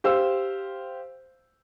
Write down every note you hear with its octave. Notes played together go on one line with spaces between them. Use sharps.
G4 C5 F5 E6